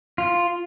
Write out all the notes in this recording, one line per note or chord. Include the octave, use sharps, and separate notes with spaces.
F4